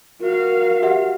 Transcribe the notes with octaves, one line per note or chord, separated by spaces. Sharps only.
F#4 A#4 F5
G4 E5 F#5